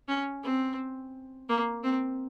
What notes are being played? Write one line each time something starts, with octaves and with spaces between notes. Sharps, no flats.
C#4
C4
A#3
C4